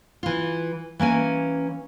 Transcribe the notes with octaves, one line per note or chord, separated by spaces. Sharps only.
E3 F4
E3 A#3 C#4 G#5